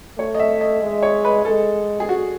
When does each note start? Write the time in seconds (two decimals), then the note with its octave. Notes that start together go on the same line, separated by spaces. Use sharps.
0.18 A3 C#5
0.35 D#5
0.40 E5
0.61 D#5
0.82 G#3
1.03 C#5
1.25 B4
1.45 G#3 A4
2.00 G#4
2.09 F#4